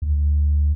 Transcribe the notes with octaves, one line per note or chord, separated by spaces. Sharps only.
D2